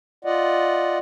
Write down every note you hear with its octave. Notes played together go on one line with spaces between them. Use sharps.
F4 D5 D#5 F#5